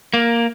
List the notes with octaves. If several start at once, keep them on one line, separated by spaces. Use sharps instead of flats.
A#3